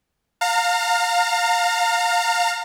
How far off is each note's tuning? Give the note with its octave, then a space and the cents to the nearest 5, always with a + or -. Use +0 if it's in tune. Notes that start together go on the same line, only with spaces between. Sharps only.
F5 +20 A#5 -30